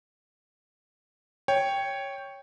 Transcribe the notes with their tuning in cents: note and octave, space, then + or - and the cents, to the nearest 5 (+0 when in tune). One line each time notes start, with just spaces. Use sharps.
C#5 +0 G5 +5